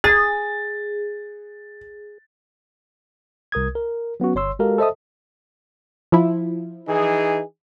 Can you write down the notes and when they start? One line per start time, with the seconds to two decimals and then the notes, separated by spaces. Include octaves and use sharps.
0.04 G#4 A6
3.52 C2 A#4 D#6 G#6
3.75 A#4
4.20 F#3 B3 C#4 F#4
4.35 G1 C#5 C6 E6
4.59 G#3 F#4 G4 A4 A#4 F5
4.78 A4 C5 D#5 E5 A5 D#6
6.12 F3 E4
6.88 E3 D#4 G#4